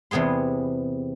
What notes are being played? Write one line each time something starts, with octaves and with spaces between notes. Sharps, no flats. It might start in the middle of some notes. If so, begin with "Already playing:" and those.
E2 C3 B3 G#4 C6